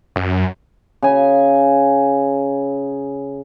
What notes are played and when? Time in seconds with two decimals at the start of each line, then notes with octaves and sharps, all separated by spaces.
0.16 F#2
1.03 C#3 G#5